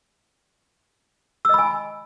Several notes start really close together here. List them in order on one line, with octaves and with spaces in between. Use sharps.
E6 D#5 B5 G#5